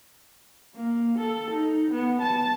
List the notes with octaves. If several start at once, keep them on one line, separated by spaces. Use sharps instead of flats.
A#3
A4
D#4
B3
A5